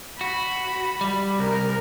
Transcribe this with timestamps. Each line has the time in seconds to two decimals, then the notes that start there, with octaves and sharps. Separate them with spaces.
0.21 F#4 B5
1.01 G3
1.39 C2 A#4